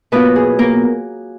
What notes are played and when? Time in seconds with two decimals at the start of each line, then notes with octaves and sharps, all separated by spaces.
0.12 B2 F#3 A#3 B3 F4 B4
0.36 G#4
0.59 A#3 A#4